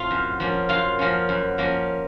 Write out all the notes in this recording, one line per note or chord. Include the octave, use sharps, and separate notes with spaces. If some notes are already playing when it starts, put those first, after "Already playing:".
Already playing: A2 A3 C4 F4 F5
F#2
F3 A#3 C#4
F#2 F4 F5
F3 A#3 C#4
F#2
F3 A#3 C#4